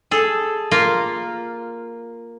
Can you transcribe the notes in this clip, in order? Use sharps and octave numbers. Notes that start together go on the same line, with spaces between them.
G#4 A4
A#3 F4